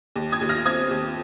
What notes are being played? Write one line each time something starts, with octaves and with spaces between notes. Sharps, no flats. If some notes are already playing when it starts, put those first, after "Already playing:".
D#2
D#6 G#6
D#2
F6 A#6
C4 D#6 G#6
D#2